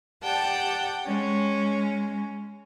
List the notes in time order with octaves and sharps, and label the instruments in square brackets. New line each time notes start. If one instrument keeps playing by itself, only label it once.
[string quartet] G4 D5 F#5 G5 A5
G#3 C#4